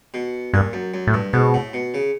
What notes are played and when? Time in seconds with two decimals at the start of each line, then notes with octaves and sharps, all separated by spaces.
0.14 B2
0.53 G2 A#2
0.73 F#2
0.94 F#2
1.07 A2
1.14 G2
1.33 G#2 B2
1.54 A2
1.73 B2
1.94 C#3